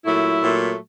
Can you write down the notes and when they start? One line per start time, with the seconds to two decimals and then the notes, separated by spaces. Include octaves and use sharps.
0.05 A#2 F#3 A3 E4
0.42 A#2 F#3 A3